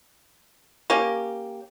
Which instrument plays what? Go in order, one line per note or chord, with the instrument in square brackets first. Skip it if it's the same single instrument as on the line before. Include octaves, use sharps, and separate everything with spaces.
[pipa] A#3 C#4 G4